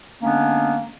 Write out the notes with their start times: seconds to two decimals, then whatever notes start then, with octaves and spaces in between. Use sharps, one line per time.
0.22 D3 G#3 A#3 B3 C#4 D4